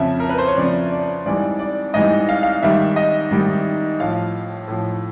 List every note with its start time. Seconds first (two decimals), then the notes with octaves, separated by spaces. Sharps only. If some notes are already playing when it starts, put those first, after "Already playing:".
Already playing: F2 C#3 F3 E5
0.20 A#4
0.29 B4
0.38 C5
0.48 C#5
0.57 F2 C#3 F3 D5
0.92 D5
1.26 G#2 E3 G3 D5
1.59 D5
1.94 G#2 E3 G3 D#5
2.29 F5
2.43 F5
2.63 G#2 D#3 G3 E5
2.96 D#5
3.31 G#2 D#3 G3
3.99 A2 F3 F5
4.68 A2 F3